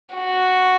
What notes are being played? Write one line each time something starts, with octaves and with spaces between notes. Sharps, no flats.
F#4